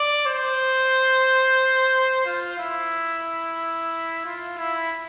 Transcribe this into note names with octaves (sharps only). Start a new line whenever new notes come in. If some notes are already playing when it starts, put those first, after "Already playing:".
Already playing: D5
C5
F4
E4
F4
E4